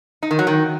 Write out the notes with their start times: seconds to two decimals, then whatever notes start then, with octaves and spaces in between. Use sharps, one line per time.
0.23 D#4
0.31 D#3
0.39 F#3
0.47 D#3